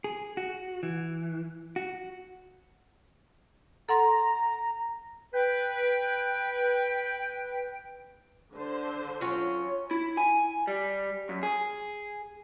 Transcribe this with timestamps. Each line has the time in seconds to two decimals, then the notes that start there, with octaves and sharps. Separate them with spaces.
0.04 G#4
0.37 F#4
0.83 E3
1.76 F#4
3.89 A4 F#5 A#5 C6
5.34 B4 G5
8.54 D3 C5
9.21 F#3 C#4 F4
9.91 E4
10.17 G#5
10.67 G3
11.29 F#2
11.43 G#4